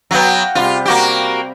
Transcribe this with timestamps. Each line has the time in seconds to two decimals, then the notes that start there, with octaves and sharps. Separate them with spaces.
0.11 F#3 B3 F#4 F5 G5
0.55 C3 G3 F4
0.85 A#3 F#4 G4